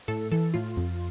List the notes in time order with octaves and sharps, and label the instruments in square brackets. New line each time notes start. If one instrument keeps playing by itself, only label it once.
[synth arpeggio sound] A2 A4
E3 A4
A2 F4
F2